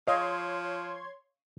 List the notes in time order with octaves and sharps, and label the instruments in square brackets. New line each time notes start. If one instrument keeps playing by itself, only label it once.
[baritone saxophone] F3 [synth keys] C#5 C6 G#6 [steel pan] D#5 [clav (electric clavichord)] F5